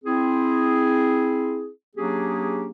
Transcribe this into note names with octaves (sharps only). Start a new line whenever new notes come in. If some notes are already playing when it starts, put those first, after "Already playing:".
C4 E4 G#4
F#3 A#3 C#4 D4 G4 G#4